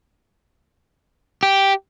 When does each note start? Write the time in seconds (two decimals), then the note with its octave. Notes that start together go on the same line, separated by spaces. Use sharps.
1.43 G4